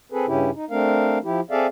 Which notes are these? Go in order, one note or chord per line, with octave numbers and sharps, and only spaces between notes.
C4 G#4 A4 B4
G2 C#3 C#4 E4 G4
D#4
A3 C4 D4 A#4 F5
F3 E4 G4
C4 G#4 A4 D5 E5 F5